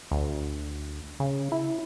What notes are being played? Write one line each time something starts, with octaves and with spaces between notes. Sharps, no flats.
D2
C#3
E4